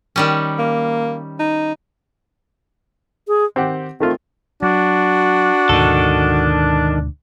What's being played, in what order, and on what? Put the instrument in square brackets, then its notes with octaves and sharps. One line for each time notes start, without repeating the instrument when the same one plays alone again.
[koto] D#3 G3 C#4
[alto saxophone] A#3
D#4
[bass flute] G#4
[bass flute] D#3 [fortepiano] C4 G4 F#5
[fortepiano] D#3 A3 F4 [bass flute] C4
[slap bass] F#3 [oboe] D4 [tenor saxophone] F#4
[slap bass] D2 G#2 B2 [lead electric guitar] D#3 A4